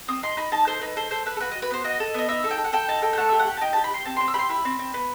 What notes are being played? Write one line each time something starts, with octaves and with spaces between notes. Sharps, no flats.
C4 D#6
D#4 C6
D#4 B5
D#4 A5
A4 C5
D#4 B4
A4 C5
A4 C5
A4 B4
A4
F#4 B4
F#4 D#5
B4
B3 C5
F#4 D#5
A4
B3 D#5
D#4 E5
A4
G5
A4
F#5
A4 G5
D#4 A5
A4 G5
G5
A3 F#5
G4 E5
F#5
G4
A5
D#4 G5
G4 A5
B5
G4 C6
C4 A5
C4 C6
E6
G4 B5 C6
E4 B5
C4
C4
B3